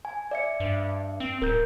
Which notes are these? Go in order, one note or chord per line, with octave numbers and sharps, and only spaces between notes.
G#5
D5 E5 C#7
G2
C4
D1 A#4 G6